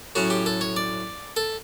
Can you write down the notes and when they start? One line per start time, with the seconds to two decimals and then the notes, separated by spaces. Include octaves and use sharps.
0.15 A2 F#3 C#4 F#4
0.30 G4
0.46 A4
0.61 C#5
0.76 D5
1.37 A4